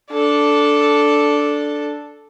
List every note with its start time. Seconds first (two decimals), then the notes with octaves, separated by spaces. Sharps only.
0.11 D4 A4